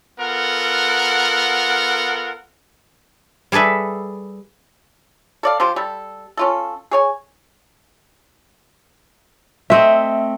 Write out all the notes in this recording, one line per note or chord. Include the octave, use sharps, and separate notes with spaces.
B3 F4 A4 A#4 F#5
G3 G#4 A4 B4 E5
A4 D5 F5
F3 F4 G4 C5
G3 A4
C#4 F4 A4
G#4 C#5 G#5
A3 C4 D#5 E5